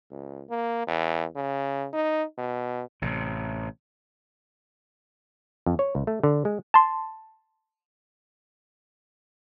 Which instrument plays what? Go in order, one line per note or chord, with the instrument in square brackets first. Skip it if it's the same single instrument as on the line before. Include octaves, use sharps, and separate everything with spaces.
[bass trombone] C#2
A#3
E2
C#3
D#4
B2
[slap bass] A1 C3
[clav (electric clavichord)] F2
C#5
C#2
A3
D3
G#3
[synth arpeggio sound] A5 C6